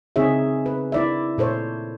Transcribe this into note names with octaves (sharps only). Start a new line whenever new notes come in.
C#3 C4 D#4 G#4 C#5 E5
B4
E4 D5 E5
A#2 A4 C5 C#5